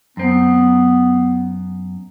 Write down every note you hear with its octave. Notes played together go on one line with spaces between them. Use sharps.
F#2 B3 C4